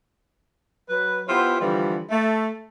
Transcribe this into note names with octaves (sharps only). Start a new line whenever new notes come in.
F#3 B4
B3 E4 F4 G4 C5
D3 E3 F3 G3
A3